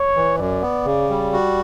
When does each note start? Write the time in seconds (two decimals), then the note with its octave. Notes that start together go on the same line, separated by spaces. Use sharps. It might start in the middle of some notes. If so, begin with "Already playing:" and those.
Already playing: C#5
0.15 E3
0.39 F#2 D5
0.62 B3
0.85 C#3
1.09 G3
1.33 F#4